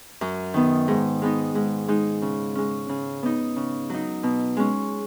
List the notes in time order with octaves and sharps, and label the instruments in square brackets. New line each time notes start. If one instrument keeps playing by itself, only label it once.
[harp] F#2
D#3 B3
G#2
G#3 B3 D#4
G#2
G#3 D#4
C#3
G#3 C#4
C#3
B3 D#4
C#3
F#3 D#4
B2
G#3 C#4